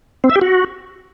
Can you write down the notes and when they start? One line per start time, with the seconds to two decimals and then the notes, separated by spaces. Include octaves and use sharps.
0.24 C4
0.30 E5
0.36 G4
0.41 F#4